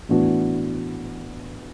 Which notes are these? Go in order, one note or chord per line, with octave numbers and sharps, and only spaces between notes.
A2 E3 B3 D4 F#4